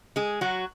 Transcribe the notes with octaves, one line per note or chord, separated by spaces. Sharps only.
G#3 G#4
F#3 F#4